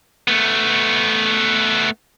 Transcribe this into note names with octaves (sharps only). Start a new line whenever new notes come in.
A3 B3